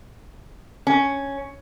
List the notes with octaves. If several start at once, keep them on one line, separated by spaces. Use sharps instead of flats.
C#4